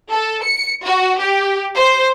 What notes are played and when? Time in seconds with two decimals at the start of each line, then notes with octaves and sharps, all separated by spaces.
0.10 A4
0.43 C#7
0.85 F#4
1.19 G4
1.75 C5